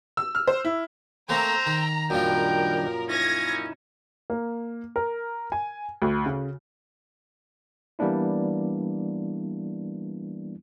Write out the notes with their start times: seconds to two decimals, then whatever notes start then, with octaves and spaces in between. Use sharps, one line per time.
0.17 E6
0.35 F6
0.47 C5
0.65 E4
1.29 A3 A#3 C4 C5 G5 A#5 E6
1.66 D#3
2.10 F#2 A#2 D#3 F3 G3 D4 A#4 G5
3.08 C#4 D#4 E4 G#6 A#6
4.30 A#3
4.96 A#4
5.52 G#5
6.02 D2
6.26 C#3
7.99 E3 G3 A#3 B3 D4 E4